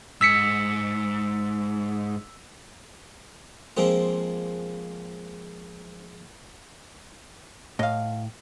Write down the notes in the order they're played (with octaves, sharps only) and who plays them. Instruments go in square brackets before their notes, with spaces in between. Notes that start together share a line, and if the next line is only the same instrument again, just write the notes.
[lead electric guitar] G#2 [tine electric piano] E6 B6 C#7
[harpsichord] F3 G#3 A#3 C4 F4
[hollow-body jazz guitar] A2 [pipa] D#5 F5